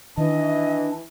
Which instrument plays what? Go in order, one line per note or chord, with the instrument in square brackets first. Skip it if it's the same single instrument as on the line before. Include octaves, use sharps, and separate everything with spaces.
[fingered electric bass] D#3 [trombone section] E3 [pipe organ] D4 [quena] D#5